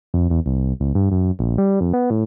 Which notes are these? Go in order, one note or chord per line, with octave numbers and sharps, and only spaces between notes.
F2
E2
C2
C#2
G2
F#2
A#1
G3
F2
B3
A2